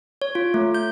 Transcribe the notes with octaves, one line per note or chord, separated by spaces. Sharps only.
C#5
F4
A3
G6